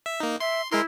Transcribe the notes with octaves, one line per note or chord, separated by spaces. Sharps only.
E5
A#3 D#4
E5 C6
G#3 E4 A#4 C6